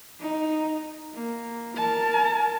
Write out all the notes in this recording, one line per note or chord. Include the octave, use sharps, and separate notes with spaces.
D#4
A#3
A#4 A5